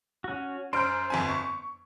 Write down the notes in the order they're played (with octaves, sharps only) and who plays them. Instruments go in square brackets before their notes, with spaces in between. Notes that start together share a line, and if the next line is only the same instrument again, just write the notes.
[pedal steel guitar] C#4 F#4
[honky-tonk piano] F#2 C5 D7 [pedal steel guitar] C6 F6 G6
[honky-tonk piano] G1 F2 G#5
C#6